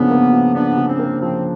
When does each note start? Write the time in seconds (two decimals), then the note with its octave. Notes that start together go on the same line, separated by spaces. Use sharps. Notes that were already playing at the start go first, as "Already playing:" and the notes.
Already playing: C#3 F3 A#3 B3 D4
0.10 A#3
0.32 F3
0.55 B3 D4
0.77 C#3
0.88 C4
0.99 A#3
1.21 F3 C4